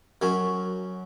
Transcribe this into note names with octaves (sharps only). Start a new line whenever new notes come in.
F#2 F#3 C#4